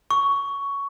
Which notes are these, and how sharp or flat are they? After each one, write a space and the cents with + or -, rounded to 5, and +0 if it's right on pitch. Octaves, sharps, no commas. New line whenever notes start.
C#6 +10